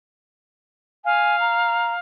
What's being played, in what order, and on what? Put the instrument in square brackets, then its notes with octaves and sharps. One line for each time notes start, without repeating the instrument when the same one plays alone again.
[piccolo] F5 [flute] G#5
[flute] A#5